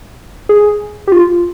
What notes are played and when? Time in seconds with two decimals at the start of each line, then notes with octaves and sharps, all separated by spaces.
0.49 G#4
1.07 G4
1.12 F4